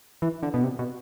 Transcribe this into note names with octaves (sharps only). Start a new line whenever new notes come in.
E3
D3
B2
C3
B2